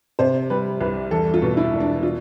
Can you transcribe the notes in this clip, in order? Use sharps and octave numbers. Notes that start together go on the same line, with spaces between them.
C3 C5
G3 B4
C2 B4
E2 A4
F4
B2
E4
E1
D4
F4